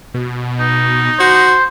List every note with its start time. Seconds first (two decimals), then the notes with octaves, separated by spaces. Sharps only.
0.14 B2
0.60 D#4
1.20 F#4 C5